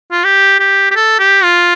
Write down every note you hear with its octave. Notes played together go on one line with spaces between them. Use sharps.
F4
G4
G4
G4
A4
G4
F4